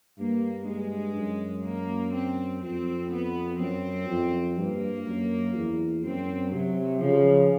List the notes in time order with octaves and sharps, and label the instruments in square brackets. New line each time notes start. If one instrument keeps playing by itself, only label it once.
[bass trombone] G2 [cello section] A#3
[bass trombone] G2 [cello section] G#3
[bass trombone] F#2
[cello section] A#3
C4
[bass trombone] F2 [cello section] C4
[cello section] B3
[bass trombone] F#2 [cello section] C4
[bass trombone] F2
[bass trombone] G2 [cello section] A#3
[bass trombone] F#2
E2
[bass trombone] F#2 [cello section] C4
[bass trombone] C3 [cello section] F#3
[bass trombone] C#3 [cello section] F3